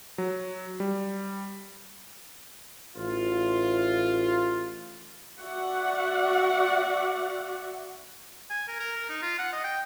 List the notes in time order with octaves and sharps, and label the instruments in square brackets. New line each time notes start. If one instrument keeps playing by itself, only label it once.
[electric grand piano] F#3
G3
[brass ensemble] A1 F4
[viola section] F#4 D5 E5 F#5
[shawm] G#5
A#4
A#4
A#4
D#4
F4
F#5
D#5
G5